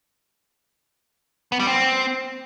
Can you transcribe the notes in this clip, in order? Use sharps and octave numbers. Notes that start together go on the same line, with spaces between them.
B3
G3
C4